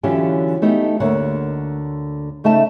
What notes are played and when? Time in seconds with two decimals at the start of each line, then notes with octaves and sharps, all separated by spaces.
0.03 D3 E3 F#3 C#4 F4 G4
0.62 A3 B3 D#4 G4
1.00 D2 D3 A#3 C#5 F#5
2.44 C#3 A3 D#4 E5 A5